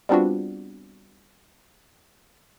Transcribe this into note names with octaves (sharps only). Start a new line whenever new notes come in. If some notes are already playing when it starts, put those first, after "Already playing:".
G3 B3 C4 D4 F4 F#4